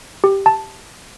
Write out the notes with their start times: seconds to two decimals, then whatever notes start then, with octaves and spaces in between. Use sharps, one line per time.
0.24 G4
0.46 A5